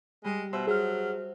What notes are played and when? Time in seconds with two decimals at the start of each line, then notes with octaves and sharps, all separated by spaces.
0.25 G3 G#3
0.53 B2 F#4 C5 E5
0.67 F#3 G#4 F6